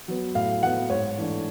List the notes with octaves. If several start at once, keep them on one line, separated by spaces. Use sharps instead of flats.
F#3 B3
A2 F5
F#3 B3 F#5
G#2 C#5
E3 A3 D4